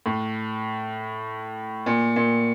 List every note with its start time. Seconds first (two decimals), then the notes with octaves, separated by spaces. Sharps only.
0.06 A2
1.86 A#2
2.16 A#2